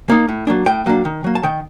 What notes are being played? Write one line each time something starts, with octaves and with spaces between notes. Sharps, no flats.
A#3 D#4
A2
F#3 A#3 D4
A2 G5
F#3 A#3 D4
D#3
F#3 A#3
A5
D#3 G5